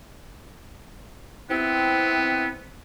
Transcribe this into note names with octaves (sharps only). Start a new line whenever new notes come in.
B3 C4 E4